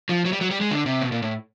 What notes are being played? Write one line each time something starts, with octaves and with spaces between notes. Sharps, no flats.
F3
F#3
G3
F#3
G3
G#3
D3
C3
B2
A#2
A2